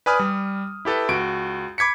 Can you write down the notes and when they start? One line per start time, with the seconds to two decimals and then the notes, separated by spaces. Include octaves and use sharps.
0.06 B4 D5 G#5 B5 D#6 F6
0.19 G3
0.85 E4 G4 A4 B4
1.09 C#2 F#4 D7
1.78 B5 D6 G#6 B6 C#7